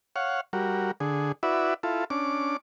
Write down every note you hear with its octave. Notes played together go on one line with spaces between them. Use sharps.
C#5 F5 F#5
G3 F#4 A#4
D3 G#4
E4 F#4 B4 D5 E5
E4 F4 A4
C#4 D4 D6